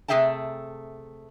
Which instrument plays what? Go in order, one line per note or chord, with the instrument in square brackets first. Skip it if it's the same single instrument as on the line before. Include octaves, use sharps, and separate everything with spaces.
[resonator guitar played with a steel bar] C3 A3 G#4 E5 G5 A5